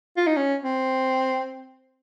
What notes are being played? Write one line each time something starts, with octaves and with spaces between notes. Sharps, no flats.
F4
D#4
C#4
C4